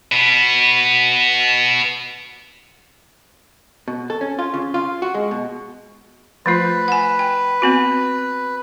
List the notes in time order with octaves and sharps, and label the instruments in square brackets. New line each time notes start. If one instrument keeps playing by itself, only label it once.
[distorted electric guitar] B2 B3
[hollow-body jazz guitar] B2
A4
C#4
F4
C#3
F4
F#4
G#3
B2
[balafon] F3 A3 F4 [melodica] B4
[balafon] F#5 G#5
G5
B3 C4 F#4